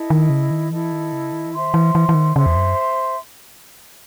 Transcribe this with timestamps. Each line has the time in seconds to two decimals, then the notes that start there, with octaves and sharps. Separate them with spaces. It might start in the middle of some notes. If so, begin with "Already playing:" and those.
Already playing: E4 A4 D#5
0.10 D#3
0.30 C#3
0.51 D#3
0.71 E3 E4 A4 D#5
0.92 D#3
1.13 C#3
1.32 D#3
1.46 E3
1.53 D#3 C5 E5 C6
1.74 E3
1.95 E3
2.09 E3
2.14 D#3
2.35 C#3 C5 E5 C6
2.46 E2
2.56 F#2